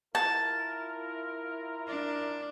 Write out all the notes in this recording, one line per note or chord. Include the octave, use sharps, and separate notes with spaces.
E4 F4 A#4 A5
D4